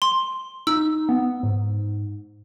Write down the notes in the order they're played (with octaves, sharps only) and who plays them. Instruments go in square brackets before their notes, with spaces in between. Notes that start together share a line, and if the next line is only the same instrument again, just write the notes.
[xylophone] C6
[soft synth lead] D#4 [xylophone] E6
[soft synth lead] B3
G#2